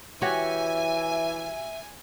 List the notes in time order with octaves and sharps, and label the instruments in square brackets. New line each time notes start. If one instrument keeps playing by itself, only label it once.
[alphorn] E3 [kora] F#4 G4 C#5 [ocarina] E5 [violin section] G#5